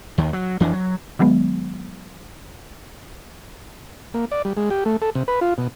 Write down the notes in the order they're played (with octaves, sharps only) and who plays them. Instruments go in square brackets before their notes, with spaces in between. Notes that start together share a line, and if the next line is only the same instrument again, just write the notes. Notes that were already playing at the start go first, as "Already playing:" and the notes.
[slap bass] D#2 D#3
F#3
F2 E3 D4
F#3
[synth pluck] D#3 F#3 G#3 B3
[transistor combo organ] A#3
D5
G3
G#3
G4
A3
A4
C3
B4
F4
B2